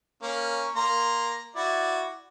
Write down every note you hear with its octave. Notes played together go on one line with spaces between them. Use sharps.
A#3 C#4
A#3 A#5 C6
E4 F#4 D5